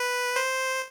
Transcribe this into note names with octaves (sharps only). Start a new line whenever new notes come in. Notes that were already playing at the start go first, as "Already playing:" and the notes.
Already playing: B4
C5